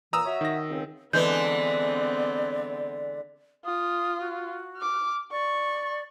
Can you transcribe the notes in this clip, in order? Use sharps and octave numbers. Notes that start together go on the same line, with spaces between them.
A#2 E3 A#5 D#6 E6
F#4 C#5 E5
D#3 A#6
C#2 C4
D3 E3 G#3 B3 C4 B4 D5 G6
F4 D#6
F#4
D6 F6
D5 C#6